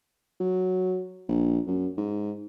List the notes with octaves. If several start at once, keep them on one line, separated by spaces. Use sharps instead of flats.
F#3
A#1
F#2
G#2